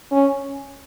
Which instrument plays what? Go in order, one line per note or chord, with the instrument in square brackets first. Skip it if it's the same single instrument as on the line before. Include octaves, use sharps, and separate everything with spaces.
[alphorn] C#4